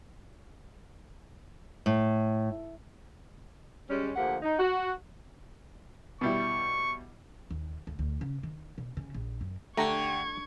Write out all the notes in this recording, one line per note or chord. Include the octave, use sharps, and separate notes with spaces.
A2
G3 G#3 C#4
D2 F3 A#3 G4 F#5
D#4
F#4
B2 G3 E4 C#6
D#2
D2
D2
C#3
D#3
B2
C#3
A#1
F#2
D3 A3 G4 A#5 C#6 G#6